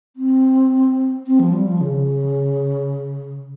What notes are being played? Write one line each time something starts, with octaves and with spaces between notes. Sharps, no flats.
C4
C4
F3
G3
F3
C#3